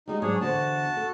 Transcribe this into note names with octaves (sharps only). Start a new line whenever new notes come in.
G3 G#3 D#4 F#4
G#2 F#3 D4 G#4 C#5
E2 D3 F#4 C5 A5
A4